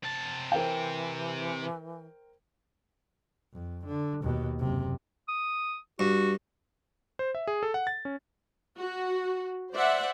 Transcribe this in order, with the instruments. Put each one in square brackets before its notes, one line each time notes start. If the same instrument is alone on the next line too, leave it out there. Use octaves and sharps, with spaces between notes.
[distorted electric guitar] C3 A5
[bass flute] E3 [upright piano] A#4 C5 G5
[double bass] F2
D3
D#2 B2
F#1 C3
[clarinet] D#6
[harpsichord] G2 [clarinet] F#4
[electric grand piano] C5
E5
G#4
A4
F#5
A6
C#4
[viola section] F#4
C5 D5 E5 F#5